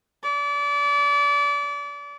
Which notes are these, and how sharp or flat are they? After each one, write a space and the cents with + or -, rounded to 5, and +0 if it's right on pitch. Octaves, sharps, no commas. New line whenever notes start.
D5 -30